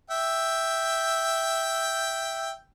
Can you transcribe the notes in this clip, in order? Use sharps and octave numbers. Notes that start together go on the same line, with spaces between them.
E5 G5